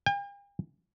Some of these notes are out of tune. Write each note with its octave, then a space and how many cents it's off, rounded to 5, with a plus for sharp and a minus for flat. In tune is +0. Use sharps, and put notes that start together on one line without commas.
G5 +45